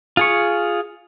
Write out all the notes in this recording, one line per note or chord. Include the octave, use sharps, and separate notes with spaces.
F4 G#4 C#6